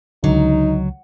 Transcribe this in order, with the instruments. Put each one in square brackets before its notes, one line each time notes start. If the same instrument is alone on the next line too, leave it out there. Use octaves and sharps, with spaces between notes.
[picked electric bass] C#2 D3 [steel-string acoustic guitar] F#3 [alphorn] D#4